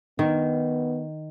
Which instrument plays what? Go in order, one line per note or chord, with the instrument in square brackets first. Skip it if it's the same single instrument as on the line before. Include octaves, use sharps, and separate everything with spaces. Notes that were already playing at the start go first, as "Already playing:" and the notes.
[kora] D#3 [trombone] B3